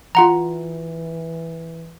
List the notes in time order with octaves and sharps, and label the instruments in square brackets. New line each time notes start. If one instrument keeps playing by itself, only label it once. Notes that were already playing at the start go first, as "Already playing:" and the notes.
[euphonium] E3 [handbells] F4 F#5 A#5